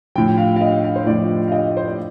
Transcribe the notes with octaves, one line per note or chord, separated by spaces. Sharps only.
A2 F3 G5
F5
F5
D#5
F5
C5
A2 F3 D5
F5
D#5
C5
D5